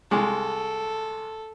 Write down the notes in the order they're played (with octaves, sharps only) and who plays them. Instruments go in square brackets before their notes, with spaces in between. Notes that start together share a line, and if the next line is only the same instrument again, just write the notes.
[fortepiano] C2 G#3 [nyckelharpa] A4